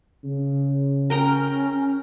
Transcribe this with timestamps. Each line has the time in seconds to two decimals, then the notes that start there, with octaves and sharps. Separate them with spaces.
0.24 C#3
1.10 C#4 A#4 G5 A#5